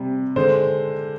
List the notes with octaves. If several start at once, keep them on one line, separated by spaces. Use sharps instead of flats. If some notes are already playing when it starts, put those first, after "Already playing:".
Already playing: C3 G3
D3 G#3 C5